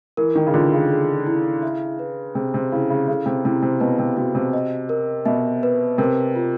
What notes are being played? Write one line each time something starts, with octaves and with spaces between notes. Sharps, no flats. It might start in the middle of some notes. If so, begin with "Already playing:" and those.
E3 A#4
D#3
C#3
D3 F4
C#3
G#4
E4
E5
B4
C3 G#4
C3
C#3 E4
C#3
C#3 A4
C3
C3 E4
C3
B2 B4
C3
C3 F#4
C3
D#5
A#4
B2 E5
B4
C3 A#4
F4